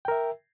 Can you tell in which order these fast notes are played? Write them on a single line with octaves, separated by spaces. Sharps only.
G5 A#4 E5